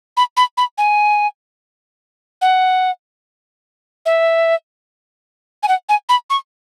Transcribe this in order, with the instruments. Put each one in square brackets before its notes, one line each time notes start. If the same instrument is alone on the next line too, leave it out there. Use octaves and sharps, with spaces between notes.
[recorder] B5
B5
B5
G#5
F#5
E5
G#5
F#5
G#5
B5
C#6